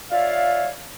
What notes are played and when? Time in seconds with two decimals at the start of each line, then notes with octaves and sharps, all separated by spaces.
0.11 F4 C#5 D5 E5 F5